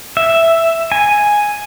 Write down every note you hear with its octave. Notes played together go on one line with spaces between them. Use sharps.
E5
G#5